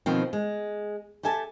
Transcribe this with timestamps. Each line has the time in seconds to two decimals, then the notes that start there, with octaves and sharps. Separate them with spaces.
0.06 B2 D#3 F3 C4
0.33 G#3
1.23 G4 A4 E5 G#5 A5